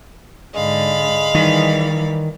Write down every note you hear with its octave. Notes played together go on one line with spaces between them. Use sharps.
G#2 D3 G#3 F5 B5
D#3 E3 G3